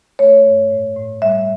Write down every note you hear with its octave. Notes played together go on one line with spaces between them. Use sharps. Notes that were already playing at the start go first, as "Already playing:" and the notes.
A3 C#5
G2
A2
A2
G3 E5